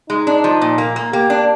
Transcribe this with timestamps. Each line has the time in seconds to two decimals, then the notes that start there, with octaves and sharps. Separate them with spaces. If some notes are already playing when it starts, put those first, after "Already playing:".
0.10 G#3 D#4
0.27 D4
0.44 F3
0.62 A#2
0.78 A#3
0.96 A#3
1.13 A#3 G4
1.30 D4